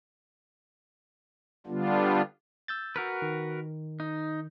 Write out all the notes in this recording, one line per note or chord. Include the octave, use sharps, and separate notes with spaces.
D3 G3 B3 D4 F4
E6 G6 A6
F#4 A#4 B4
D#3
D#4